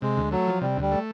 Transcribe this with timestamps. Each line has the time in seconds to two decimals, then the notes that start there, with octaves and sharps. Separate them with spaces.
0.02 C3 G#3
0.17 D2
0.32 F#3 A3
0.47 F3
0.61 C3 G3
0.77 D2 G3
0.92 A3